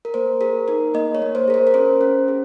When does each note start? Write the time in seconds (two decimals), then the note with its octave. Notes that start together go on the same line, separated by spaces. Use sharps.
0.05 A#4
0.14 A#3 C5
0.41 G#4 A#4
0.68 D#4 A#4
0.94 A#3 D#5
1.15 C#5
1.22 A#3
1.35 C5
1.48 G#4 A#4
1.54 C5
1.67 A#4
1.74 C#4 C5
2.01 C#4
2.28 G#4